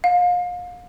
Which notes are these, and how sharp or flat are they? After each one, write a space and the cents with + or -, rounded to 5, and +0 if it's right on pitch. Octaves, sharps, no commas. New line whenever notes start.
F5 +35